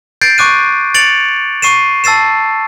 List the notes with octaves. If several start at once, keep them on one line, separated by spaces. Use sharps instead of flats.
G6 A6 C7 D7
C#6 D6 F#6 D#7
A6 C#7 D7 F7 F#7
C#6 C7 D#7 E7
A5 E6 A6 C7 E7